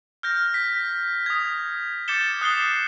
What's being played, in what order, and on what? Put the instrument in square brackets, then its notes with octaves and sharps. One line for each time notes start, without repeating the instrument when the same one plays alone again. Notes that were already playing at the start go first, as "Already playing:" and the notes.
[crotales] F6 G6 A#6
B6
D#6 G#6
D6 G6 A6 C#7 E7 G7
D#6 F#6 C7 G7